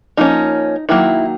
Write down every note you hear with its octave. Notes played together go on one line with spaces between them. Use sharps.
F3 A#3 C#4 D#4
D#3 F#3 A#3 E4